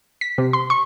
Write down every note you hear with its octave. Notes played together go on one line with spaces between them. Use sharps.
B6
C3
C6
C#6